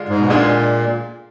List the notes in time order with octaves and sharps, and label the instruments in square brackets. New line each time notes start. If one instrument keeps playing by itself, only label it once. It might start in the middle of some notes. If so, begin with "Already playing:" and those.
Already playing: [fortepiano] D3 G#3 D4 F4
[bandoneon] G#2
B2
[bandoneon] A#2 [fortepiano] D3 G#3 D4 F4 G#4